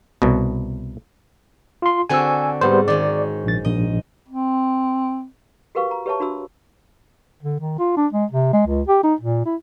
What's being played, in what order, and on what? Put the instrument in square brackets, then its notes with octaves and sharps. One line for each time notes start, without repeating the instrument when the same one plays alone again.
[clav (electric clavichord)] C2 B2
[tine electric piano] F4 C6
[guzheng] D3 C4 F#4 [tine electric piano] G#5 E6
[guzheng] G#2 [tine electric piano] G3 B3 C5
[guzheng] D#3 G#3 C#4 [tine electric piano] D5
[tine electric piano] A#1 A6
[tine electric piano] A#1 [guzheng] D#5
[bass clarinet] C4
[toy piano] F#4 G4 A#4 B4 F5 C#6
A#5
G4 B4 C#5 E5 A5 C#6
D4 F#4 B5 E6
[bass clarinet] D3
D#3
F4
D4
G#3
C3
G#3
C#2
G4
D#4
A#2
E4